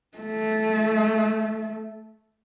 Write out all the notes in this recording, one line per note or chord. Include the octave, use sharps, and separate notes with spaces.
A3